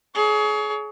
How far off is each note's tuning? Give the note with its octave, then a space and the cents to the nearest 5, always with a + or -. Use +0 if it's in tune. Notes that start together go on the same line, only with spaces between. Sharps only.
G#4 +30 C#5 +30